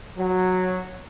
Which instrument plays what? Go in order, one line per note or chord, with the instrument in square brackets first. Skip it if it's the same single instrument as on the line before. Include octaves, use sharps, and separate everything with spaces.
[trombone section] F#3